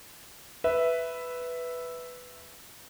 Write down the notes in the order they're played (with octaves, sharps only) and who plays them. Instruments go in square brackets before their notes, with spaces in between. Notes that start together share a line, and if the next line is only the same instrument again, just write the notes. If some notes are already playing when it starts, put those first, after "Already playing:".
[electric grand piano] B4 [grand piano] E5